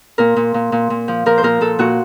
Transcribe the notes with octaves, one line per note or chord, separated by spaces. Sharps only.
A#2 A#4
A#2
A#2
A#2
A#2
F3
F3 A#4
C5
A#2 A#4
A#2 A4
A#2 F#4